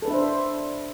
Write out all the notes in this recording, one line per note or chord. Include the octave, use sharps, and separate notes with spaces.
D4 A4 B4 C5 E5